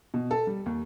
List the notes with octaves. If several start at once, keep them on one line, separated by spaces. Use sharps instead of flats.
B2
A4
G3
D#2